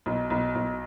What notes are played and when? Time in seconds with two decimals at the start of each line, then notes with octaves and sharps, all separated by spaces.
0.06 B1
0.30 B1
0.55 B1